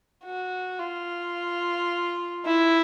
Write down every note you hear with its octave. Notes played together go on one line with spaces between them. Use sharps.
F#4
F4
E4